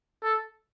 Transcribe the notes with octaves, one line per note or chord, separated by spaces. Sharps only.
A4